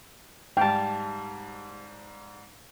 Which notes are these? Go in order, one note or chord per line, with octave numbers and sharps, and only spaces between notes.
G#2 G3 F5 G5 A5